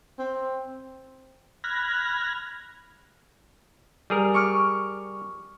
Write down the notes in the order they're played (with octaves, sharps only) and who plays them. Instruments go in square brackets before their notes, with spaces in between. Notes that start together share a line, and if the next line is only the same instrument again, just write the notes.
[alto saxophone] C4
[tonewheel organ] B5 F6 F#6 G#6 A#6
[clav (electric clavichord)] G3 G#4 A#4
[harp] C#6 D6 F6